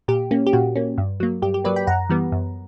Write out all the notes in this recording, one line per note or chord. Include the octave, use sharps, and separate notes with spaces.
A#2 G4
A#3 C#4
G4
A#2 F#4
A#3 C#4
G2
F#3 A#3
G2 G4
G4
F#3 A#3 B4 D5
G5 B5
F#2 F#5 A#5
E3 G3 B3
F#2